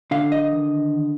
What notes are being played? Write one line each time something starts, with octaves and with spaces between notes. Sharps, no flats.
D3 F5
D#5
D#3